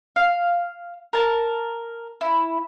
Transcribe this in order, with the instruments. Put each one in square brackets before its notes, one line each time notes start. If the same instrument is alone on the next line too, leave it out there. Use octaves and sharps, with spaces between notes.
[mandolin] F5
A#4 A5
E4